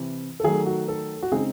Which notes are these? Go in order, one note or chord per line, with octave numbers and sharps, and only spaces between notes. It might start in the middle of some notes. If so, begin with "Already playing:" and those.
Already playing: C3 E3 C4 E4
A4
D#3 F#3 A3 G#4
F#4
A4
F#4
C#3 G#3 C4 D#4 G#4